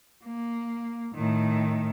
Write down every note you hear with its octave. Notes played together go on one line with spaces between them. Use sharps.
A#3
A2 D#3